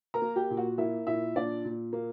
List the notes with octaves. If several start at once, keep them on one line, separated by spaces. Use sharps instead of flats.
A#4 A#5
A#3
G4 G5
A#2
F#4 F#5
A#3 E4 E5
A#2 E4 E5
A#2 D4 D5
A#2
A#3